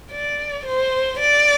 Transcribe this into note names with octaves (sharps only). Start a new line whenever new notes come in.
D5
C5
D5